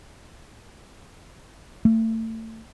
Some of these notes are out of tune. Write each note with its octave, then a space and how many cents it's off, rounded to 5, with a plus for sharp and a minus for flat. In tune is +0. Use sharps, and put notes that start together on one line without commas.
A3 +30